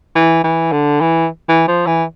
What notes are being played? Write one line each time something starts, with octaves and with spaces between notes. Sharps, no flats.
E3
E3
D3
E3
E3
F3
E3